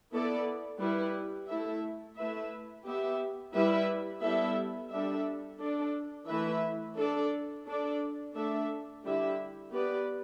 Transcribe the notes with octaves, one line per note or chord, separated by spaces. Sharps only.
B3 E4 A4 D5
G3 E4 B4
A3 E4 A4 E5
A3 E4 B4 E5
B3 G4 E5
G3 E4 B4 E5
G3 B3 E4 A4 E5
G3 D4 A4 E5
D4 A4 D5
E3 A3 E4 B4 E5
D4 A4 D5
D4 A4 D5
A3 D4 A4 E5
D3 G3 E4 G4 E5
B3 G4 B4 D5